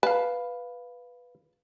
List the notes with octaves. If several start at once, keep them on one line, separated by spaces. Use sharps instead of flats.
B4 F5 A5